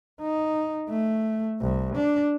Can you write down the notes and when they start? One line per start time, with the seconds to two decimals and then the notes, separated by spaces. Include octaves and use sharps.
0.21 D#4
0.89 A3
1.61 C2
1.96 D4